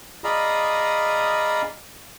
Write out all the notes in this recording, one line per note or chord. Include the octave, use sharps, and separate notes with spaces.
G#4 D5 D#5 F5 A#5 B5